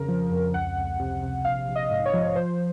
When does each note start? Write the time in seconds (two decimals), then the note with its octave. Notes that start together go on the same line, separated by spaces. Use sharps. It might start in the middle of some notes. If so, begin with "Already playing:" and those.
Already playing: F2 C#3 A#4
0.08 F3
0.31 F2
0.54 C#2 F#5
0.76 C#2
0.99 C3
1.22 C3
1.45 A#1 F5
1.68 A#1
1.75 D#5
1.90 G#2
2.06 C#5
2.13 F3
2.36 F3 C5